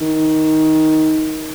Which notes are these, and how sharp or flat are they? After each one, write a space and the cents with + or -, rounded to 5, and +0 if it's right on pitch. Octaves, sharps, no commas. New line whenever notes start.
D#3 +10